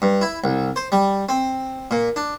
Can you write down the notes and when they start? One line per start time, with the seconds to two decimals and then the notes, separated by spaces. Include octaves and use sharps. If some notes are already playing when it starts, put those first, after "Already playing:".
0.02 G2
0.21 E4
0.44 C2
0.76 C5
0.92 G3
1.29 C4
1.91 A#2
2.16 D4